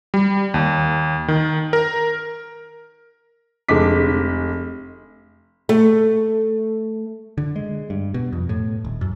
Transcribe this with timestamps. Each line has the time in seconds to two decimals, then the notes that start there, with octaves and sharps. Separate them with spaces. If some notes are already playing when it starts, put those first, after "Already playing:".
0.14 G3
0.54 D#2
1.28 D#3
1.73 A#4
3.69 F1 D3 G#3 D6 B6
5.69 A3
7.38 D3
7.56 G#3
7.90 G2
8.14 B2
8.33 F2
8.49 A2
8.85 D#1
9.01 F#2